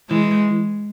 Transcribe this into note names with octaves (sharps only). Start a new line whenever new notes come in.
E3 G#3